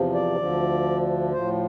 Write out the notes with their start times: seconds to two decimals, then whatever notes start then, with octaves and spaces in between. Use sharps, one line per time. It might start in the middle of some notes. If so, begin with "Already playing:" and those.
Already playing: E2 C3 F3
0.14 D5
0.38 D2 D3 F3
1.33 A2 F3 C5